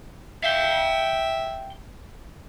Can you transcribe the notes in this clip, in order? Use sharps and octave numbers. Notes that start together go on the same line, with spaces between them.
E5 F5 G5